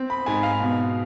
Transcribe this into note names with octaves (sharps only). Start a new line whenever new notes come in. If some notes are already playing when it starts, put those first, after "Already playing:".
Already playing: C4
B5
G#2 G#5
F5
B2